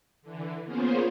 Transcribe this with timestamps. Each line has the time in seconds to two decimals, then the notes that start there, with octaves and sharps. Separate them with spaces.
0.22 D3 E3
0.65 A#3 B3 C#4 F4 G#4 C5